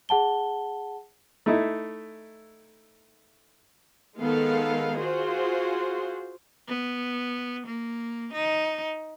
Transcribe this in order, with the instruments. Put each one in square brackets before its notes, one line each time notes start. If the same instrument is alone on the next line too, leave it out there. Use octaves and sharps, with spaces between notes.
[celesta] G#4 F#5 A5 G7
[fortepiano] A3 D#4 E4
[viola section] D#3 G#3 B3 A4 F5
F4 F#4 G#4 C5
[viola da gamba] B3
A#3
D#4